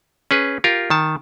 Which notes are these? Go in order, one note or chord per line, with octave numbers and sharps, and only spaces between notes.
C#4 G#4 B4
F4 G4 A#4
D#3 A5